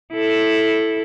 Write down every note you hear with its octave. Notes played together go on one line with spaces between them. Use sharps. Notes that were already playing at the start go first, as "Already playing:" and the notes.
E4 A4